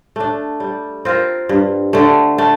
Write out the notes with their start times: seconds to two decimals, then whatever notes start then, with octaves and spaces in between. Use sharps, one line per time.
0.16 A3 D4
0.60 G3
1.05 C4 F4 A#4
1.49 G2
1.93 D3 A3
2.38 A3